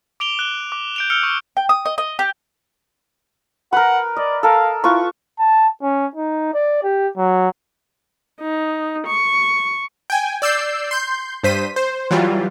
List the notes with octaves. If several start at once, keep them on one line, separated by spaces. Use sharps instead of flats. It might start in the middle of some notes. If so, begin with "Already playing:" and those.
D6 D7 F7 G7
F#6 G7
D6
G6 D7 F7
E6 F6 C#7 F7 G7
C#6
G5
D#6
D#5
D#5
G4
A#4 B4 F#5
D5 D#5
A4 A#4 F5
E4 F4 B4 C#6
A5
C#4
D#4
D5
G4
F#3
D#4
C#6
G5 G#5
D5 E6 G6 C7
C6 G6
G2 C5 B6 D#7
C5
E3 F#3 G3 F4